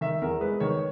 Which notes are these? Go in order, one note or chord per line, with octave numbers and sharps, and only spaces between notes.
D#3 E5
E2 A#4
G#3 B4
D#3 C#5